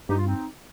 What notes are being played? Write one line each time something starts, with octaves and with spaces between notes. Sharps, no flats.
G2 D#4 G4
F4
C4 D#4